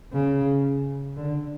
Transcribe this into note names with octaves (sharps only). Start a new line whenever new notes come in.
C#3
D3